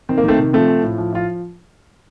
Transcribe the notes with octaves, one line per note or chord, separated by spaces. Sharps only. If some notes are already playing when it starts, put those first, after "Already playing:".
D#3 C4
A#3
D#3 A3 C4
C3
F3 A3 C4
F3
A2
F3
F3 F4